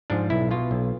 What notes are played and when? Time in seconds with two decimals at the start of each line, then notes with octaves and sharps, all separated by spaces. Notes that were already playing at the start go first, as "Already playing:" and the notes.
0.10 G#2 F3 D4
0.30 B1 E4
0.51 B2 F4
0.71 B1